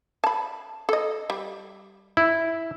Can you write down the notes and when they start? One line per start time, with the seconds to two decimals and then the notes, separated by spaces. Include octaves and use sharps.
0.24 A5 B5
0.89 A4 D#5
1.30 G3
2.17 E4